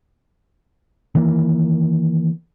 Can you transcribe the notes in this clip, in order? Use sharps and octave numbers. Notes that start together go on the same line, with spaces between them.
D#3 E3 A#3